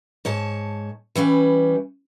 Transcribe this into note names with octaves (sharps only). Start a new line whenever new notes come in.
G#2 C#5 A5
E3 G3 C#4 B4